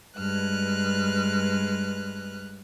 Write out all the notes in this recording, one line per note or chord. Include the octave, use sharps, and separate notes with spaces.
G2 G#3 B4 F6 F#6